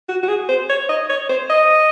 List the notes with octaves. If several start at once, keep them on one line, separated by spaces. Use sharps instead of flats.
F#4
F#4
G#4
C5
C#5
D#5
C#5
C5
D#5